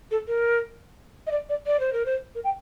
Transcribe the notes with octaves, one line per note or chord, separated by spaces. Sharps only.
A4
A#4
D#5
D5
D5
D5
C5
A#4
C5
A#4
G5